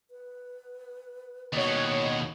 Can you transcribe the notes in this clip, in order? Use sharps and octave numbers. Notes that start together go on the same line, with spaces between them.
B4
D#2 B2 C#5 D#5